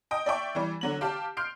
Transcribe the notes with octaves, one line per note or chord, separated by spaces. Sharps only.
D#5 G5 D#6
D5 E5 G5 C#6
E3 G3
D3 F#3 F#7
G4 F5 A5
C6 F6 G6 C7 D7